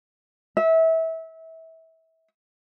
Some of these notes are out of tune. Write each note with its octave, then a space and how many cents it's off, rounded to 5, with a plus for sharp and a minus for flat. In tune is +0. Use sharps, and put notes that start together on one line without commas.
E5 -25